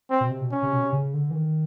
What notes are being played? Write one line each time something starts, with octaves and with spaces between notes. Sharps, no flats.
C4
B2
C3
B2
C#4
C3
B2
C3
C#3
D3
E3
D#3